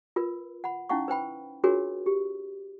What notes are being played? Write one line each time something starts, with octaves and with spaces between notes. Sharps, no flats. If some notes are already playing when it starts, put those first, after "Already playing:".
F4 A#4 B4
F#5 B5
C#4 D#4 E4 F5 F#5 C#6
B4 C5 G5 B5
D4 F4 F#4 G#4 A#4 C#5
G4